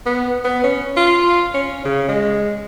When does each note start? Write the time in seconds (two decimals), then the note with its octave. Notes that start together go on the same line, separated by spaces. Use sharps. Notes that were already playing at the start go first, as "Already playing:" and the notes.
0.06 B3
0.44 B3
0.64 C#4
0.97 F4
1.54 C#4
1.85 C#3
2.08 G#3